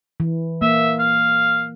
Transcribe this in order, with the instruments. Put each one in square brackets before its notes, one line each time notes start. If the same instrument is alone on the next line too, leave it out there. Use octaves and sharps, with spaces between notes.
[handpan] E3
[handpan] A#3 [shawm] E5
[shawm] F5